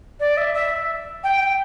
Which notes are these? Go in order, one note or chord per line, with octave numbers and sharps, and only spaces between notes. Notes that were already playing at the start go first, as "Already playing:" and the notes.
D5
E5
E5
G5
G5